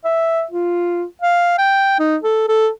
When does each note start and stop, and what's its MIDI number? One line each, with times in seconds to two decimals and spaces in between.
0.05 0.44 76
0.51 1.04 65
1.22 1.57 77
1.58 1.96 79
1.99 2.16 63
2.23 2.45 69
2.48 2.69 69